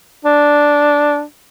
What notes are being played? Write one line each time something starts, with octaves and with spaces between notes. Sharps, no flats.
D4